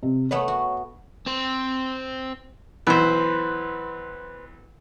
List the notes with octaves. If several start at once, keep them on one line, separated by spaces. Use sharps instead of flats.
C3
A3 B3 B4 C#5
F#4
C4 C5
B1 E3 B4 C5